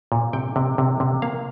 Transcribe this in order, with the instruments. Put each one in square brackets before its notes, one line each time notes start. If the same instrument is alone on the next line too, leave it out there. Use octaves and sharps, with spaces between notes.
[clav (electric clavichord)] A#2
C3 G5
C3
C3
C3
A#3 F5